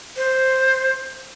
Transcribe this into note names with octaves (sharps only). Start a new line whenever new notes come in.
C5